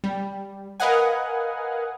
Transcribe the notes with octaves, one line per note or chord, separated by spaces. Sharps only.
G3
A#4 B4 D#5 F5 F#5 G#5